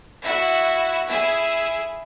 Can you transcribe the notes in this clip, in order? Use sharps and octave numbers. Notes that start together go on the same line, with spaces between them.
E4 F#4
E4 G#4